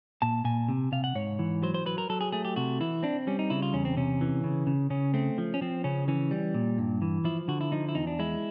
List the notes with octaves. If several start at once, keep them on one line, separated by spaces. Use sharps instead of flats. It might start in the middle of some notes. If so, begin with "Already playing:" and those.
A#2 A5
A#2 G#5
C3
C3 F5
F#5
G#2 C#5
E3
F#3 C5
C5
F#3 B4
A#4
F#3 A4
G#4
A3 G#4
G4
C3 F#4
E3 E4
C4 D4
G3 C#4
D#4
C#3 E4
F4
E2 C#4
C4
C3 C#4
E3
C#3
C#3
C#3 C#4
A3 C4
F3
C#4
F3 C4
C#3 C#4
E3 C#4
G3
A#2
G2
E3
F3 E4
D3 F#4
E4
F3 D#4
E4
E2 D#4
D4
G#3 E4